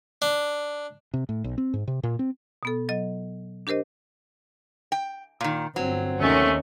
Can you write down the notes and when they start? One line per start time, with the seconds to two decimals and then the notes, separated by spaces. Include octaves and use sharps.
0.22 D4
1.14 C3
1.29 A2
1.44 B1
1.58 C4
1.74 G#2
1.88 C3
2.03 A#2
2.19 C4
2.63 B2 B3 A4
2.89 F#3 D#5
3.67 D4 G4 A#4 C5 D#5
4.92 G5
5.41 A#2 D#3
5.76 G1 F#3 C4
6.21 D#2 C3 D#3 A3 C#4